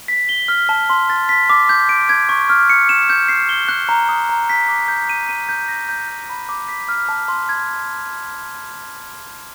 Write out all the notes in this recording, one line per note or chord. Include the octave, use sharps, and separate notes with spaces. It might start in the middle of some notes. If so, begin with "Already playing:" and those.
B6
G7
F6
A5
C6
A6
B6
D6
G6
D7
G#6
C#6
F6
C#7
E7
G6
C7
G7
F#6
A#5
D#6
A#5
B6
D6
G6
D#7
D#7
G6
A#6
G6
G6
B5
D6
B6
F6
A5
C6
G#6